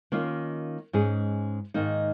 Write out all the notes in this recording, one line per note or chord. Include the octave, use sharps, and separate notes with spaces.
D#3 A#3 C#4 F4
G#2 G#3 C#4 G#4
G#2 D#3 A#3 D#4